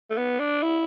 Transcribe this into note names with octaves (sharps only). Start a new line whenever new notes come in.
A3
B3
D4
E4